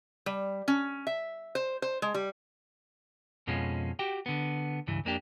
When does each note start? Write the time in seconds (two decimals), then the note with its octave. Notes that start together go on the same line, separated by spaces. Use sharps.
0.26 G3
0.68 C#4
1.07 E5
1.55 C5
1.82 C5
2.02 G#3
2.14 G3
3.47 F2 B2 F3 G#3 C#4
3.99 F#4 G4 G5
4.26 D3 B3
4.87 C#2 G2 E3
5.05 F2 A#3 D4 G4